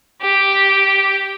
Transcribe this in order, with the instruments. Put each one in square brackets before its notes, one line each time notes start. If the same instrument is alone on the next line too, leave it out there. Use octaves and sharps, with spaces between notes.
[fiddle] G4